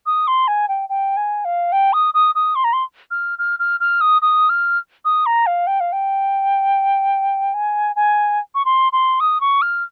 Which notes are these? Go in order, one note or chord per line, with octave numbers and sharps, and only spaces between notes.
D#6
C6
G#5
G5
G5
G#5
F5
G5
D#6
D#6
D#6
C6
A#5
C6
F6
F6
F6
F6
D#6
D#6
F6
D#6
A#5
F5
G5
F5
G5
G#5
G#5
C#6
C6
C6
D#6
C#6
F6